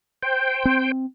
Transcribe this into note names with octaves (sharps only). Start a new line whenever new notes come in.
C5 G5
C4